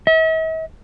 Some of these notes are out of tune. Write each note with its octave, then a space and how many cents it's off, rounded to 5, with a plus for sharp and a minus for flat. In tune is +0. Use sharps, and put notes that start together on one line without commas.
E5 -45